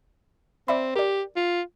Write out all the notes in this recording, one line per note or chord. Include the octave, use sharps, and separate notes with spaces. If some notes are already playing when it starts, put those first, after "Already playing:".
C4 D5 E5 B5
G4 A#4 D5
F4